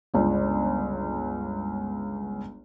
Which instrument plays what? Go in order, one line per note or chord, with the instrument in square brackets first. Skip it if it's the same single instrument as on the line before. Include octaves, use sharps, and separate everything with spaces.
[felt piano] G1 C#2